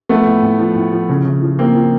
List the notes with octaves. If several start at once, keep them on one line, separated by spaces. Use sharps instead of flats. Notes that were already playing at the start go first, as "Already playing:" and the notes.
F3 A3 B3
A2
A2
F3
A2
F3
C#3
C#3
F3
F3 A#3 C4
F3